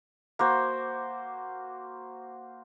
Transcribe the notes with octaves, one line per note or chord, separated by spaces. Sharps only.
A#3 F#4 C5